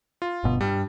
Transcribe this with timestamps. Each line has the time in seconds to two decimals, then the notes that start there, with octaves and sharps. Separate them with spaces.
0.22 F4
0.44 G1 B2
0.61 G2 G3